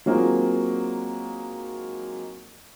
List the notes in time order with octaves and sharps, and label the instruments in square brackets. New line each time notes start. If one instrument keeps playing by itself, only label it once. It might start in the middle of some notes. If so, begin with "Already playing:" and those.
[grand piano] F#3 G#3 A#3 C4 D#4 F4